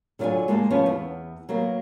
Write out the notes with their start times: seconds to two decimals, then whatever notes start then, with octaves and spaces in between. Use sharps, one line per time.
0.19 D3 F#3 F4 B4 D5 G#5
0.48 G#3 A#3 D#4 A5
0.70 F3 B3 C#4 C#5
0.86 E2 B3
1.49 F#3 A#3 B3